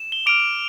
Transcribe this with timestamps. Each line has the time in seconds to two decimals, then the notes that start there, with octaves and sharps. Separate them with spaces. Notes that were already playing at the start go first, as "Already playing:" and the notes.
Already playing: E7
0.12 G7
0.26 D6 F6 D7 F7